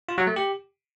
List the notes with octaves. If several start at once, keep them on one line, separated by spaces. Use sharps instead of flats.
F4
F#3
A3
G4